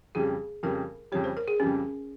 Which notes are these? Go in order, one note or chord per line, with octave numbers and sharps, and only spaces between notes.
F2 C#3 G3 G#4
F2 C#3 G3 A#4
F2 C#3 G3 C#5
C5
A#4
G#4
F2 C#3 G3 C#4